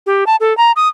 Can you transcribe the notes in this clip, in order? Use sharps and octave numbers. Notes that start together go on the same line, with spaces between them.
G4
A5
A4
A#5
D#6